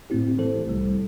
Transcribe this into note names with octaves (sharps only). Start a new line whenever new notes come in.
A2 A3 C4 E4 G4
E3 A3 E4 A4 C5
C2 C3 G3